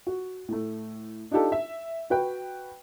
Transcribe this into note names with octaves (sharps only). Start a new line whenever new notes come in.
F#4
A2 A3
D4 D#4 F4 G4 A4
E5
F#4 B4 G5